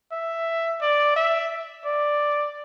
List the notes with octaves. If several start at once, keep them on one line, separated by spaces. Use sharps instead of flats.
E5
D5
E5
D5